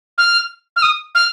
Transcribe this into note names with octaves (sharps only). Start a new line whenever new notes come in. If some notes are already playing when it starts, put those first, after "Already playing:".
F6
F6
D#6
F6